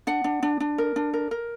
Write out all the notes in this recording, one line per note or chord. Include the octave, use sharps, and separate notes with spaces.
D4 F#5
D4
D4
D4
A#4
D4
A#4
A#4